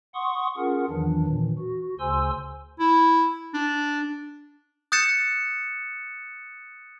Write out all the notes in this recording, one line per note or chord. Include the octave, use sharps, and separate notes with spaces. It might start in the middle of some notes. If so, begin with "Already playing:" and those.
F#5 C6 C#6 D#6
C#4 F4 G#4 A#4 F#5
E2 D#3 E3 F#3 D4
A#2 D#3 E3
F#4
D2 C#3 C5 G#5 C6 E6
E4
D4
D#6 F#6 G6 A6 C#7 E7